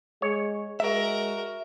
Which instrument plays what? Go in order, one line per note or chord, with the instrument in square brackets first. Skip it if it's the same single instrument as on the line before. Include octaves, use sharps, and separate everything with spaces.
[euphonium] G#3 [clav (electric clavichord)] C#5
[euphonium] G#3 [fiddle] F#4 A#4 [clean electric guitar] E5